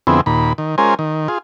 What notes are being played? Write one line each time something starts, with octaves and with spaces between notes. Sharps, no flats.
F2 D3 B3 C4 E4 G#4
D#2 A#2 B5
D#3
G#3 C#4 F4 A#4 C5 G#5
D#3
F4 G#4